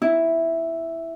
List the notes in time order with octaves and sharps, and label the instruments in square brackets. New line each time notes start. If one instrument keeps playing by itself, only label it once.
[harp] E4